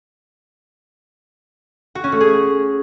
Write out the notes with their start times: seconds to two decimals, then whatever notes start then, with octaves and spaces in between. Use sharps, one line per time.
1.95 F#4
2.04 C#4
2.12 A3
2.21 G#4